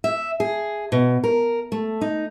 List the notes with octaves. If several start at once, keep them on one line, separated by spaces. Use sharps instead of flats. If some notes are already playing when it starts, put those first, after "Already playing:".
E5
G#4
B2
A#4
A3
D#4